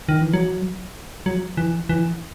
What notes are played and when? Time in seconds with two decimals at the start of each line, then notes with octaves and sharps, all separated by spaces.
0.09 D#3
0.21 E3
0.33 F#3
1.26 F#3
1.57 E3
1.89 E3